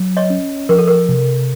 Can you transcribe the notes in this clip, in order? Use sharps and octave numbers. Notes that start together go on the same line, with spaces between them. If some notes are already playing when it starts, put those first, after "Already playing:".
Already playing: F#3
C#5 D#5
C#4
F3 A#4
A4
A#4
C3